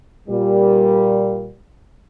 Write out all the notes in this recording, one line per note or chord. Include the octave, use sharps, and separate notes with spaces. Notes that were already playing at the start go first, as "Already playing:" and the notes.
A#2 G3